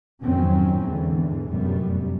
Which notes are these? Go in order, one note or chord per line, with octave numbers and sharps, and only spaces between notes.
F2 G#2 D#3 F#3 C4 C#4
E2 G#2 D3 E3
F1 F#2 A2 G3 B3